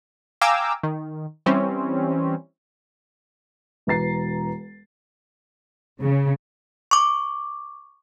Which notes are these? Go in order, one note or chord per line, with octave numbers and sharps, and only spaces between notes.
F5 G5 G#5 A#5 D6 E6
D#3
E3 G3 C4 C#4
E1 B4 A#5 A6 C7
C#3
C#6 D6